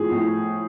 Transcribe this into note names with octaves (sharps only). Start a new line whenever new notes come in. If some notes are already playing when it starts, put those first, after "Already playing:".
Already playing: A2 F3 G#4
A2